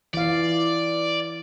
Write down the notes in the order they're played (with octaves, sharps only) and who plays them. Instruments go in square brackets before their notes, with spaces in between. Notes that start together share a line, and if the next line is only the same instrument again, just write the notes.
[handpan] E3 F5 [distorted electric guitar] D5